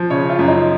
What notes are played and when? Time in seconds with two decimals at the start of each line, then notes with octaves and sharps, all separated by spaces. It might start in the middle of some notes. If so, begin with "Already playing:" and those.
Already playing: F3
0.10 C#3 C#5
0.29 F4
0.39 F#2
0.48 D#4